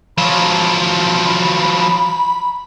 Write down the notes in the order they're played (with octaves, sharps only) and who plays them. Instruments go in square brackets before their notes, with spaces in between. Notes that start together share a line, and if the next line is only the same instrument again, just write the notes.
[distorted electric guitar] F3 F#3 [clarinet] B5